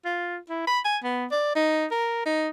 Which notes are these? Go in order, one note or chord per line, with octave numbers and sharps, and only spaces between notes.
F4
E4
B5
G#5
B3
D5
D#4
A#4
D#4